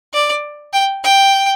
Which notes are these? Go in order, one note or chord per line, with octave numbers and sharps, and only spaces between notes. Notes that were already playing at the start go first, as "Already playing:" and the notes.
D5
G5
G5